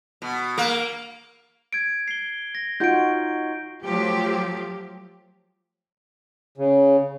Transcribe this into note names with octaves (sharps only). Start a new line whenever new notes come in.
B2
A#3
G#6 D7
C7 G7
A#6
D#4 F4 F#4 G6 D7
F3 F#3 A3 G4
C#3